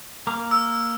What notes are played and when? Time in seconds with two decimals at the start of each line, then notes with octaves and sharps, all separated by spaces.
0.27 A#3 A#5 D6
0.51 E6